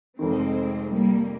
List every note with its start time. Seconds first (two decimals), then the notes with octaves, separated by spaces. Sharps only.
0.19 F1 F2 D#3 G#3 C4
0.92 G3 A#3